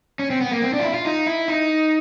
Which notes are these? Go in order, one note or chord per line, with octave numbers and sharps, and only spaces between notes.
C#4
C4
B3
A#3
C4
D4
F4
E4
F4
D#4
E4
D#4